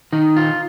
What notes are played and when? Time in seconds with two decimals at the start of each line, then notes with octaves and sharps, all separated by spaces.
0.12 D#3 D#4
0.36 F4